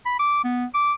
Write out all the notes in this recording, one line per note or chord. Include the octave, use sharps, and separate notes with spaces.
B5
D6
B3
D6